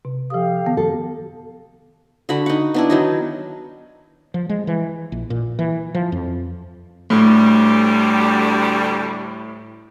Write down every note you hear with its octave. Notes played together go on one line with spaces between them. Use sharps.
C3
F3 G4 A4 F5 D#6
D#3 B3
A4
D3 F#4 B5
D#4 F#5
B3 D4 E4
D#3 F#3 D#4
F3
G#3
E3
A#1
A#2
E3
F3
F2
D2 A2 G3